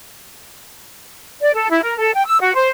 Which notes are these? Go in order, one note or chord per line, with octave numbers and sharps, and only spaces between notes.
D5
A4
E4
A#4
A4
G5
E6
F#4
C5